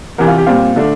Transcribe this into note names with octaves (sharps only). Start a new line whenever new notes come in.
E2 C3 E3 A#4
F4
G4
A#2 G3 C4 F4
D3 A3 D4